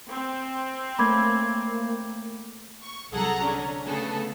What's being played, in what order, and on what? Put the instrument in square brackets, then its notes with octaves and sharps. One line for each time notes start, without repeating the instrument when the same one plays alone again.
[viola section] C4
[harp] A3 C#4 [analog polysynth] A#3 [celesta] B5 D6 G#6
[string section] C#6
C2 F#3 G#4 A4 F#5 A#5
D3 C#4 D4
C#3 A3 B3 G#4 A4